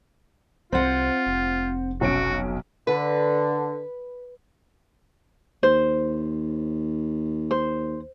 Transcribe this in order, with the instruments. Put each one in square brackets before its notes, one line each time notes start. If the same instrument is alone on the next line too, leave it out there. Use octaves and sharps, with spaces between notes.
[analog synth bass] C2 [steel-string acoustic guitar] C4 F#5 [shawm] F4 [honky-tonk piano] C5
[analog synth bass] F1
[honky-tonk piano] B1 C#4 D7 [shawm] F#4
[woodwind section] D3 [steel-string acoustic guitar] B4
[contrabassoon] D#2 [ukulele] C5
[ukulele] C5